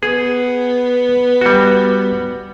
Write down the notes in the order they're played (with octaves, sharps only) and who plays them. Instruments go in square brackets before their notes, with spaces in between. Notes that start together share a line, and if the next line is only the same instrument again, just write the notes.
[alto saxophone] B3 [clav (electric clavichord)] G#4
[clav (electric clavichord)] G3 F#4